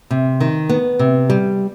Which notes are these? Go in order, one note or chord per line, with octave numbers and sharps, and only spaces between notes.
C3
D#3
B3
C3
G3